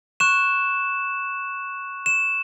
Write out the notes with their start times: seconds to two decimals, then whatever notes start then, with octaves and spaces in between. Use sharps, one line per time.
0.20 C#6 F#6 E7
2.06 E7